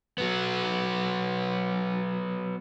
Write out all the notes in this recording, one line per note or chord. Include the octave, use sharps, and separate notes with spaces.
F#3 B3